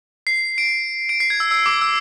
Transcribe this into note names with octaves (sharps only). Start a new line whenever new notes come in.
C7
D7
D7
C7
G#6
E6
E6
D6
E6